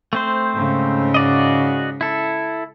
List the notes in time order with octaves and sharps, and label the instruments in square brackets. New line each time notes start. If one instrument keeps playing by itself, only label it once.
[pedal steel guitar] A3 C4 C5
[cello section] G#2 C#3
[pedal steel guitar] F#4 D5 D#5
E4 A4